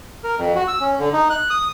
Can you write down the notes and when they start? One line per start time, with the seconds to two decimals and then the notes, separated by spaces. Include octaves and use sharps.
0.24 A#4
0.38 F2
0.55 F#4
0.68 E6
0.80 C#4
0.99 D3
1.13 D#4
1.30 F#6
1.50 D#6